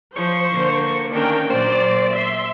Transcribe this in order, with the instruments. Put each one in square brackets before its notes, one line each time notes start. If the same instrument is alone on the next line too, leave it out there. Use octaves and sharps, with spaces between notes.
[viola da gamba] F3 [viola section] C5 [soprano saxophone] C#6
[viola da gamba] D3 A#3
[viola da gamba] D#3 A#3 C#4 [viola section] D4 A#4 G5
[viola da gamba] A#2 F#3 [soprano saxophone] C5 [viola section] D5
[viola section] E5 C6